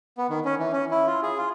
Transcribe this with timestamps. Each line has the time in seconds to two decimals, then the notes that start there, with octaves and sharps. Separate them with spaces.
0.18 B3
0.30 D#3
0.45 C#4
0.59 E3
0.73 C#4
0.91 E4
1.07 F4
1.23 G#4
1.38 F4